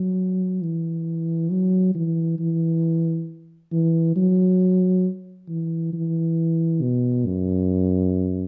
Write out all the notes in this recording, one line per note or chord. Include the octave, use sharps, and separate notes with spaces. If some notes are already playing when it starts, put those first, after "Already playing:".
Already playing: F#3
E3
F#3
E3
E3
E3
F#3
E3
E3
B2
F#2